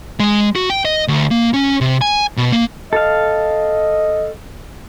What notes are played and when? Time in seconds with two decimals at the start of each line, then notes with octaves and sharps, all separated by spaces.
0.20 G#3
0.56 F#4
0.70 G5
0.85 D#5
1.08 D2
1.31 A#3
1.54 C#4
1.81 C3
2.01 G#5
2.37 B2
2.52 A#3
2.93 A4 D#5 F5